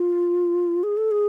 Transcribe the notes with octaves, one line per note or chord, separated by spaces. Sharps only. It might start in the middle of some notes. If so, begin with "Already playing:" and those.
Already playing: F4
G#4
A4
G#4